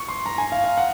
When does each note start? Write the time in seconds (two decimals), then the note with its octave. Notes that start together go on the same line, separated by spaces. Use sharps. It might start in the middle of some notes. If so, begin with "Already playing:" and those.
Already playing: C#6
0.08 C6
0.26 A#5
0.38 G#5
0.52 F5
0.64 F5
0.78 F#5